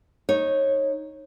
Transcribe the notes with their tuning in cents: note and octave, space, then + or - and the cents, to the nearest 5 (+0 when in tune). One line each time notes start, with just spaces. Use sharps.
D#4 +0 C#5 -20